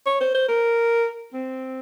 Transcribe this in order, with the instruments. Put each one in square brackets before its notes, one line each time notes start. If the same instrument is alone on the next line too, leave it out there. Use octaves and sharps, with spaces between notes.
[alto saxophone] C#5
C5
C5
A#4
C4